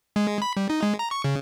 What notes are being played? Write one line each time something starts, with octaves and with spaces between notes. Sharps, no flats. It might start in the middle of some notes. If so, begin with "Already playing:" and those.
G#3
B5
G3
D#4
G#3
A#5
C#6
C#3